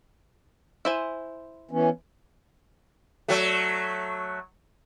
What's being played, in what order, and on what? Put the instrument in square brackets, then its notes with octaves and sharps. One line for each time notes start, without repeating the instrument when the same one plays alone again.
[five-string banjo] E4 C5 G#5
[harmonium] E3 B3 C#4
[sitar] F#3 A3